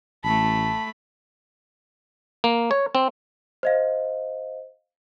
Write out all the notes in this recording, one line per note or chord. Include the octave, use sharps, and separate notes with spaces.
A1 A3 A5 B5
A#3
C#5
C4
C5 D#5 F5